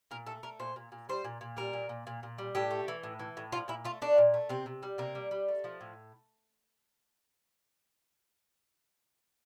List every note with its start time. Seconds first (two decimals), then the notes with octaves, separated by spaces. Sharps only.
0.11 A#2 A#4
0.27 A3 A4
0.43 A3 A#4
0.60 A#2 C5
0.76 A#2
0.92 A#2
1.09 G3 C5
1.24 A#2
1.41 A#2
1.57 G3 A#4
1.73 A#2
1.89 A#2
2.07 A#2
2.23 A#2
2.38 G3
2.55 A2 G4
2.71 A3
2.88 E3
3.03 A2
3.19 E3
3.37 A2
3.52 F3 F4
3.68 A#2 E4
3.85 A3 F4
4.02 A3 D4
4.18 A#2
4.34 A3
4.49 C3 C4
4.66 C3
4.83 G3
4.98 C3 A#3
5.15 G3
5.31 G3
5.48 A3
5.64 F3
5.81 A2